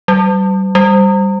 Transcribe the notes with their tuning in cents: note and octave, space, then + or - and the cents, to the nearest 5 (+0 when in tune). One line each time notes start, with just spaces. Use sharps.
G3 -35
G3 +0